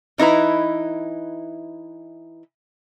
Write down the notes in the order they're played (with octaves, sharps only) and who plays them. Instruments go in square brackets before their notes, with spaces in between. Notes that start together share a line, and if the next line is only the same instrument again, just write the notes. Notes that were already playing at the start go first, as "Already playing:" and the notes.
[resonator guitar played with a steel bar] E3 D#4 E4 B4 A#5